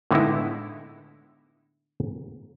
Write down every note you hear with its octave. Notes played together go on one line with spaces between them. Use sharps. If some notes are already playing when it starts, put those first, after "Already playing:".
A2 D3 G#3 B3 D#4 E4